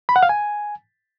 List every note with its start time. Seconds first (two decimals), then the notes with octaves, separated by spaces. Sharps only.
0.09 B5
0.16 F#5
0.23 F5
0.29 G#5